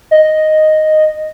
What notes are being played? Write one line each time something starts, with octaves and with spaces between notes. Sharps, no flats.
D#5